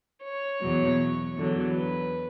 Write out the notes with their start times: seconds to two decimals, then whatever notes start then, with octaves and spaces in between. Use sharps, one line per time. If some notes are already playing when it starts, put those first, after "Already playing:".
0.23 C#5
0.61 E2 B2 F#3
1.36 E2 D3 F#3
1.73 B4